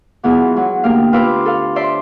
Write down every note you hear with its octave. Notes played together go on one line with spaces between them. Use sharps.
B2 E3 F#3 B3 F4 G#4
F#3
D2 A#3 G4 F5
F4 B4 F5 D6 E6
A4 F5
C5 D5 E5 A5 C6